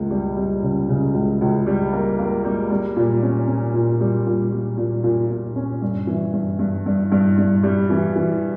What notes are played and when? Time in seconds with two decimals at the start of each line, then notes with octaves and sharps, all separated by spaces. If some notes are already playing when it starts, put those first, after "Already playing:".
Already playing: C#2 A#3
0.11 G3
0.37 G3
0.63 C#3
0.89 C#3
1.14 C#2
1.41 C#2
1.67 G3
1.93 A#3
2.19 A#3
2.44 G3
2.70 G3
2.96 A#2
3.23 C#4
3.48 C#4
3.74 A#2
4.01 G3
4.26 A#2
4.52 G3
4.77 A#2
5.04 A#2
5.30 A#2
5.56 C#4
5.82 G2
6.07 E3
6.33 G2
6.59 G2
6.86 G2
7.12 G2
7.38 G2
7.63 G3
7.90 E3
8.16 E3